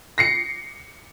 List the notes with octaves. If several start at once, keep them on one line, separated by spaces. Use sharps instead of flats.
A#6 C7 C#7